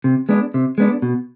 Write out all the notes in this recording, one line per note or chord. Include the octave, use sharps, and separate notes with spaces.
C3
G#3 B3 D4
C3
G#3 B3 D4
B2